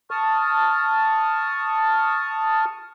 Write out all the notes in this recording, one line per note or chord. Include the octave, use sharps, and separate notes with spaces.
A5 C#6 D#6 F6